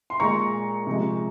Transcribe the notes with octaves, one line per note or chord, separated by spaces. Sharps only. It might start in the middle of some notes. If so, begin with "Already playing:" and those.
C6
A#2 G#3 A#5 C#6
C3 F3 G#3